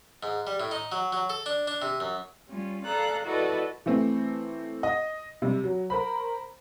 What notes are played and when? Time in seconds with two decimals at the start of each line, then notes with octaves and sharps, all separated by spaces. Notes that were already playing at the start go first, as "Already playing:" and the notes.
0.23 G#2
0.47 G3
0.60 A2
0.71 D#4
0.92 F#3
1.13 F#3
1.30 A4
1.46 D4
1.68 D4
1.82 C3
2.00 F#2
2.48 G3 C#4 F4
2.85 A4 D5 F5 A#5 F#6
3.25 E4 F#4 A4 B4 D5 D#5
3.86 E3 A3 C4
4.83 D#5
5.42 C3 G3
5.64 F#3
5.90 A#4 C5 B5